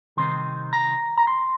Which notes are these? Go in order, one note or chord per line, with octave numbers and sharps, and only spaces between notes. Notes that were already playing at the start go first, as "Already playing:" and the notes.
C3 D#3 G3 C4 D#4 C6
A#5
A#5
C6